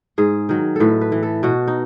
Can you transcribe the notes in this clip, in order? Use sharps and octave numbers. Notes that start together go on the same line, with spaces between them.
G#2 G#4
D#3 F#3
A2 A4 B4
B4
E3
A4
B2 F#4
D#4